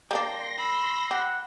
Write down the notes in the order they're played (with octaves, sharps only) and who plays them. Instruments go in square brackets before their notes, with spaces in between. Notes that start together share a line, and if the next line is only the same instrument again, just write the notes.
[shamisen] G3 A#3 D4 [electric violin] G5 [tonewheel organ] C6 A#6
[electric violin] B5 E6
[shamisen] G4 [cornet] F#5